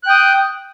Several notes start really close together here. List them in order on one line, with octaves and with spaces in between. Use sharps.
F#6 G5 D#6